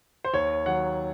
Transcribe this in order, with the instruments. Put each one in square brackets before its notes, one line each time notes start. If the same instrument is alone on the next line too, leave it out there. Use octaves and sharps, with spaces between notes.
[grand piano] C5
D#2 C#5
D#3 F#3 F#5